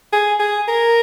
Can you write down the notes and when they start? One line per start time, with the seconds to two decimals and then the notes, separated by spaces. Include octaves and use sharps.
0.13 G#4
0.40 G#4
0.68 A#4